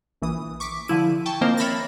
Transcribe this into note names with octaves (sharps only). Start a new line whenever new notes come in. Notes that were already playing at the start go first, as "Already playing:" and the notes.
A#1 E3 D#6
C#6 D6 B6
D3 F3 E4 D#7
G5 A5 C#6
D#3 F3 A#3 C4 A#4 C5
C#5 E5 B5 F6 A6 A#6